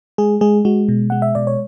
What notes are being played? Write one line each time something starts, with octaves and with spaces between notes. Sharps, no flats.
G#3 G#4
G#3 G#4
G#3 F#4
B2
G#3 F#5
E5
B2 D5
C#5